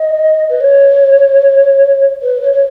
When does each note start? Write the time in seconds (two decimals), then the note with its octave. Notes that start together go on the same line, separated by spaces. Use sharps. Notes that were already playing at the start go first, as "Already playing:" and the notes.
Already playing: D#5
0.49 B4
0.61 C#5
2.22 B4
2.42 C#5
2.53 C#5